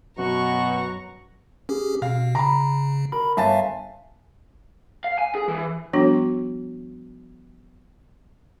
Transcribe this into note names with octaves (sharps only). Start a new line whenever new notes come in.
F#2 B2 F#4 A#5 C#6
C#4 G4 G#4
B2 F5
C#3 A#5 B5
A#4 B5
G1 E5 F5 G#5 A5 A6
F5
G#5
G#4
E3
F3 G3 B3 D4 F#4